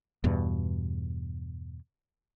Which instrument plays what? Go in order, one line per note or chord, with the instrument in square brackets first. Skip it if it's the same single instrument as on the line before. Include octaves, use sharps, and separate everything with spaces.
[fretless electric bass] E2 G2 B2